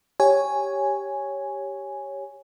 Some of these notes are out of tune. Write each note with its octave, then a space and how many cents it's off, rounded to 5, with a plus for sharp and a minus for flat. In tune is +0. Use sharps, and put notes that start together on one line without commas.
G4 +0 C#5 +0 G#5 +0